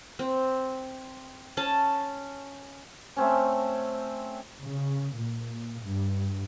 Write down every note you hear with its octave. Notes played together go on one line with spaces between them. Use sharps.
C4
C#4 A5
A3 C4 C#4
C#3
A#2
G2